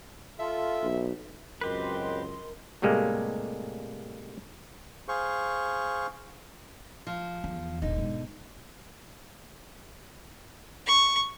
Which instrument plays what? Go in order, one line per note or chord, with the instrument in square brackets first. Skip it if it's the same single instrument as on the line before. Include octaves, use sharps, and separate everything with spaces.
[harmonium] F4 A4 [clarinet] E5
[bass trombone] B1
[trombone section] C#2 F#2 [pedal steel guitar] C4 G4 B4 [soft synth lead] A#4 [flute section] D#5 C6
[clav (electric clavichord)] A2 C3 G3 G#3 A#3
[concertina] G#4 C5 F5 C#6
[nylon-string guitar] F3
[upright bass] E2
[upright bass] E1 A1 [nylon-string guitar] D3 D#4
[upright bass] G#2 B2
[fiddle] C#6